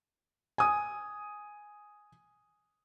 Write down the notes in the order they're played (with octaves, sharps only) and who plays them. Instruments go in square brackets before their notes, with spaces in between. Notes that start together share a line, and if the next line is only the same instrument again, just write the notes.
[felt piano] G#5 D#6